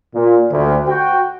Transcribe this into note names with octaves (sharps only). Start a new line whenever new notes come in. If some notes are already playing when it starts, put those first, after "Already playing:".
A#2
D2
F#4 G5